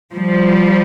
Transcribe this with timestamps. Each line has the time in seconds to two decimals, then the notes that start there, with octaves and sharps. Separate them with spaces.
0.13 F3 G3